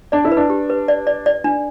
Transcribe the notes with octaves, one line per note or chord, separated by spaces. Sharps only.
D4 D5
E4
B4
D4
G4
B4
D5
D5
D5
D4